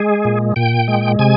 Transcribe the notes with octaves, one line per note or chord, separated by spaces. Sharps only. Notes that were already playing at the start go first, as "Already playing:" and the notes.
Already playing: G#3 G#4
A#2
A#2 G5
G#3
C3 G#5